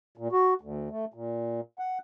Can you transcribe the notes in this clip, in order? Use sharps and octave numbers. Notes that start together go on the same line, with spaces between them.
A#2
F#4
D2
A3
A#2
F#5